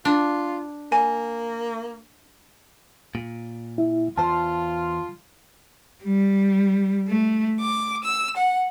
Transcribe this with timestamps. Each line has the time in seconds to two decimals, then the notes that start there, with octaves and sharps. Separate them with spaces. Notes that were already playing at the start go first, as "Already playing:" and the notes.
0.05 D4 F4
0.92 A#3 G#5
3.15 A#2
3.78 E4
4.18 E2 F4 C5 A5
6.04 G3
7.08 A3
7.60 D6
8.03 E6
8.36 F#5